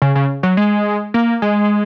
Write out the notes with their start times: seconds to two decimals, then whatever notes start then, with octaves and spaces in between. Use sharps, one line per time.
0.02 C#3
0.15 C#3
0.43 F#3
0.57 G#3
1.14 A#3
1.42 G#3